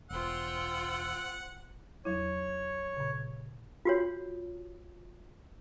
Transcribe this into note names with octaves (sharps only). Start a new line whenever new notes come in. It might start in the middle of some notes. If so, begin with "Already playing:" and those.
E1 F4 C5 F#5 G5 E6
E2 F#3 E4 C#5
A#2 C#3
F4 F#4 C#5